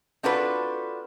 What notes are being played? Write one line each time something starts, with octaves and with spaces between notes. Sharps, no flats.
C4 D4 F4 F#4 A4 B4